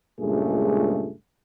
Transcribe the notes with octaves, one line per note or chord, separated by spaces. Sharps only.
C#2 G2 A#2 G#3 A3 G#4